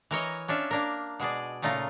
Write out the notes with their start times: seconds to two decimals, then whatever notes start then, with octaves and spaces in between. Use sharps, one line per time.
0.11 E3 A#4 C#5 D#5
0.48 C#4 D4 F4 E5
0.71 A#3 D4 A#4
1.20 B2 G#3 G#4 D5
1.62 A#2 C#3 A3 D#4 F4 A#5